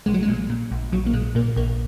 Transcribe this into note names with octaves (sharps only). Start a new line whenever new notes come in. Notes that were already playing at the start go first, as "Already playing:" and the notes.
A#1 G#3
F#3
G#3
A#2
A#2
A#1
A#1 F#3
A#3
A#2 G#3
A#2 A#3
A#1 A#3